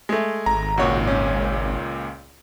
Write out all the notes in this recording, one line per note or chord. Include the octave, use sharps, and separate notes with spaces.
G#3 A3
G#1 A#5
C#2 A#2 F#4 C#5
C#4